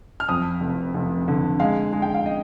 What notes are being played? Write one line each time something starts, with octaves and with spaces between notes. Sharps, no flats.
F6
F2 D#6
F1
F1
D3
G#3 F5
G#3
G5
F5
D#5